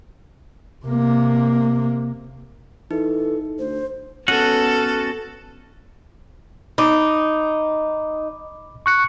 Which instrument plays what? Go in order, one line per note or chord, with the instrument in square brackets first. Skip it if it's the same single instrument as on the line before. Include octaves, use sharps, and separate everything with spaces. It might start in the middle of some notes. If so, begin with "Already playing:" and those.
[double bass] C3 A#3
[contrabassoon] E3 [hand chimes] D#4 [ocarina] A4
[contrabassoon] D2 [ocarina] C5
[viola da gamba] B3 A4 [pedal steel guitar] C#4 F#4 F#5
[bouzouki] D#4 [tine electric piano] B5 D6
[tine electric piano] C#6 F#6 C#7